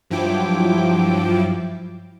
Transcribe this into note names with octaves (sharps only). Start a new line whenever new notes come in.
G2 F3 F#3 E4 G5 D6